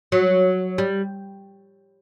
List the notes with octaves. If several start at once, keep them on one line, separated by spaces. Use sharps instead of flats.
F#3
G3